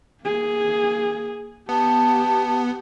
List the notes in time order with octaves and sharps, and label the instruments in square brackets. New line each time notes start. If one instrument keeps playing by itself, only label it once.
[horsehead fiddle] A#3 G#4
[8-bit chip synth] B3 [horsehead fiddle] G4 [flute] A5